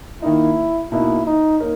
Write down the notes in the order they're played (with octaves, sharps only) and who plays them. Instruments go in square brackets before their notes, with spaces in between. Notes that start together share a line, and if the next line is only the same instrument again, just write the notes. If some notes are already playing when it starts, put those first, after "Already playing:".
[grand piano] D#3 A#3 D#4 [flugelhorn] E4
[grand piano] B2 A#3 D#4 [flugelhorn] E4
[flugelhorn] D#4
[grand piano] A#3 D#4 A#4 C#5